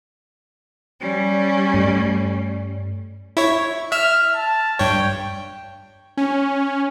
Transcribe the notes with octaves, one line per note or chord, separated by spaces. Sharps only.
G3 C#4
G2 A3
E4 C#5
E5 E6 F6
A5
G2 C#5 G5
C#4